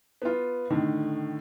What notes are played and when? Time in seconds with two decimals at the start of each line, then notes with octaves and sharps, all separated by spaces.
0.22 B3 F4
0.70 A2 D3 D#3